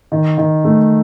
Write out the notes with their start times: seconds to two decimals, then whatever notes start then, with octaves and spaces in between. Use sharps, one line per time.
0.12 D#3
0.38 D#3
0.64 A3